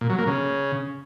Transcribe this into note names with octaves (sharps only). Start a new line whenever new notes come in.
A#2
F#3
A#3
C#3